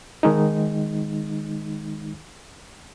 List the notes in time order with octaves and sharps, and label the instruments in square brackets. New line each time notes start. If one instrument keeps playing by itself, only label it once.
[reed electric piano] D#3 G#3 D#4